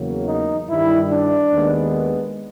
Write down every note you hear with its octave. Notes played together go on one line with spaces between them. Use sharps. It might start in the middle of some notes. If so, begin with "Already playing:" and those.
Already playing: E2 C#3 F#3 A#3
D#4
G2 D#3 G3 E4
D4
D#2 D#3 G#3 B3